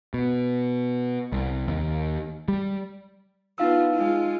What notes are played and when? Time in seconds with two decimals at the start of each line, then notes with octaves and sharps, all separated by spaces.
0.14 B2
1.32 C2
1.68 D#2
2.48 G3
3.58 B3 D#4 F4 F5 E6
3.94 G#3 F4